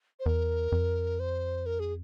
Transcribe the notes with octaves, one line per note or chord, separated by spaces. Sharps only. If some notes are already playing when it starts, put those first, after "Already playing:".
C5
E2 A#4
F2
C5
A#4
G#4